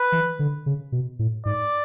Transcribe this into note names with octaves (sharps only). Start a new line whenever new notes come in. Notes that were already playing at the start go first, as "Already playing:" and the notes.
Already playing: B4
E3
D3
C#3
B2
A2
G#2 D5